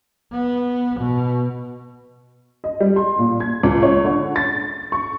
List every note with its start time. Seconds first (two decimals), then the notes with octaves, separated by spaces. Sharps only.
0.32 B3
1.00 B2
2.64 D#5
2.80 G3
2.96 C6
3.19 A#2
3.40 G#6
3.63 C#2
3.83 C#5
4.05 D3
4.36 A6
4.92 C#6